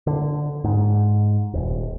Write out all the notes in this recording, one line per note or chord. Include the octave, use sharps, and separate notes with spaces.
D3
G#2
D#1